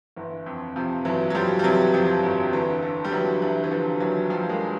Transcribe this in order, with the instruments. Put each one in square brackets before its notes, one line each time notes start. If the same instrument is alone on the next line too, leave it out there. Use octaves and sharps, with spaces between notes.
[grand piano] G1 E3
F2
C3 F3
G1 E3 F#3
F#3
G1 F3 G3
G3
C3 E3 F#3
F2 F3
G1
D3 E3
D3
G3
D3 E3 F#3
D3 E3
E3
D3 F3
D#2 E3 F#3
D3 F3 G3
G#3 A#3